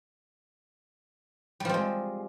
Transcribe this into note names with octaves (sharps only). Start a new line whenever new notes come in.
F3 G3 G#3 C4